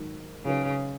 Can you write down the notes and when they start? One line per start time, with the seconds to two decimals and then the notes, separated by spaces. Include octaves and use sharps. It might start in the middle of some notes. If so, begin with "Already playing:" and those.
Already playing: G#2 D#3 F#3
0.45 C#3 F#3 D#4 B4